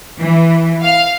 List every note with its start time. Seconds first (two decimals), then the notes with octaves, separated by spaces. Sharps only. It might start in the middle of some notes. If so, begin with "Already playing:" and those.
0.19 E3
0.84 F5